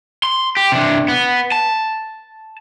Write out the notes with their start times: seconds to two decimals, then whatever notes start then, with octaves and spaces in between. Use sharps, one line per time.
0.23 C6
0.57 G4
0.72 C3 D4
1.08 B3
1.52 A5